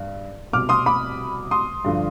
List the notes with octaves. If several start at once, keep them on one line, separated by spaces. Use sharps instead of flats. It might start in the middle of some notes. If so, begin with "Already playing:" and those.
Already playing: G2
C2 B2 D6 F6
C6 D#6
B5 D6
C6 D#6
G2 D3 F3